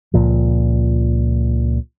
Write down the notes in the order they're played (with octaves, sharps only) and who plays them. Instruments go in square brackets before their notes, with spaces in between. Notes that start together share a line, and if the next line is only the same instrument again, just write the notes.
[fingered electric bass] C#2 A#2 F3